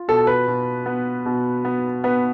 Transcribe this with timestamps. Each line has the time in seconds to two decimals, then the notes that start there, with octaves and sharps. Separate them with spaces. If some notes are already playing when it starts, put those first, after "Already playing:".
Already playing: F4
0.08 B2 A4
0.27 B4
0.47 B2
0.86 B3
1.26 B2
1.65 B3
2.04 B3 B4